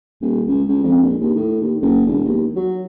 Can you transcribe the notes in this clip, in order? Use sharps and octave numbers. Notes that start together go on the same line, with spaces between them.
D#1
C#2
C#2
F2
A#1
D#2
A2
D#2
F#1
E1
D#2
F#3